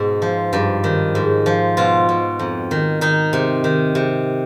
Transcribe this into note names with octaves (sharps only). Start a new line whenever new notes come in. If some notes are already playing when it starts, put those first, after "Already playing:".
Already playing: G#2 B2
F3
G2
D#3
G#2
F3
B2 F4
B2
F2
D#3
D#3 D#4
C3
D#3
C3